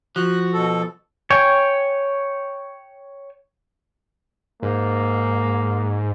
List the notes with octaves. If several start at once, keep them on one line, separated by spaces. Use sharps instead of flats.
F3 F#4 F#6
B2 A4
C#5 G5 G#5
G#2 A#3